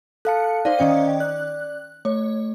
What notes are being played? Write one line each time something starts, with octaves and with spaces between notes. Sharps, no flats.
A4 F5 A5 F#6 C#7
D#4 C5 D5 F5
D#3 C#4 C5 D5 D#5 G5
D5 F#6
A3 C#5